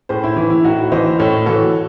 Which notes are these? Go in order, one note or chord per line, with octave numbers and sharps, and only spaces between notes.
A2 G#4 C5
E4
E3 E4
E4
A2 D#4 F#4
E3 C5 D#5
A2 A4 C#5
E3 F#4 A4